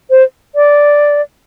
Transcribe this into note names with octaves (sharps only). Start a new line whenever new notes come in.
C5
D5